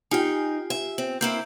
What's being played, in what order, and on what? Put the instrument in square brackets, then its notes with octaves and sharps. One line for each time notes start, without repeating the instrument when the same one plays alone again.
[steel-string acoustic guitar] D#4 G5 [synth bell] F4 G4 G#5
[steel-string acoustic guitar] E5
C4
[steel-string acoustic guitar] A#3 C4 E4 [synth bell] G6